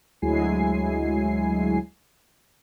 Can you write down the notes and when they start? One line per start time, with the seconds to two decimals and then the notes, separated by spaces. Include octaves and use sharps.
0.22 D2 F#3 G#3 E4 G#5 C7